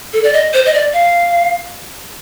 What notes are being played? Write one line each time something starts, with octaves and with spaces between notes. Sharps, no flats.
A4
D5
D#5
C5
D#5
D5
F5